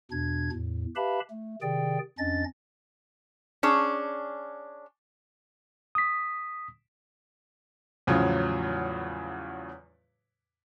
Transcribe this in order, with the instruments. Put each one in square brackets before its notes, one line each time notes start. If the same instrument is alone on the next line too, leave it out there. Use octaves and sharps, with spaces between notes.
[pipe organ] E2 B2 D4 G#6
E2 A2
G4 B4 E5 F5 A5 B5
A3
C3 D#3 G#4 D5 G5
F2 C#4 D4 D#5 A6
[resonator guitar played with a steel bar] C#4 D4 G#4
[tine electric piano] D#6 B6
[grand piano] E2 A2 C#3 F3 F#3